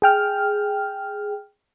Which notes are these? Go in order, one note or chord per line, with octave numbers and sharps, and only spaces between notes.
G#4 G5 F6